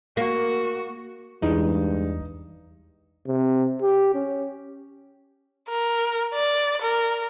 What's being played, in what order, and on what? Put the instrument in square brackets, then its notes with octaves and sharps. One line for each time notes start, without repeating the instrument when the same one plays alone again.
[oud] A#3 [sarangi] F#4
[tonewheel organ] E2 [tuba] G2 [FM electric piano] E3 G#3 [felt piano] D#4
[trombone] C3
G4
C#4
[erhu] A#4
D5
A#4